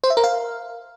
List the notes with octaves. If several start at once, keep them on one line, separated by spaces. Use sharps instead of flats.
C5
E5
A#4
F5